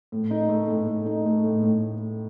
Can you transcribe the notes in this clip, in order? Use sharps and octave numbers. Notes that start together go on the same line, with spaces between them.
A2
D#4
A3
A2
A2
D#4
A3
A2
A2